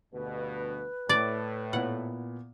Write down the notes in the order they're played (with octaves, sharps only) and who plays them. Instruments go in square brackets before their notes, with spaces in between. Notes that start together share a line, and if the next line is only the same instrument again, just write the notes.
[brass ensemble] D2 G2 B2 [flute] B4
[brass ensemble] A2 [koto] D5
[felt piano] A#2 B3 E4 [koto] F#5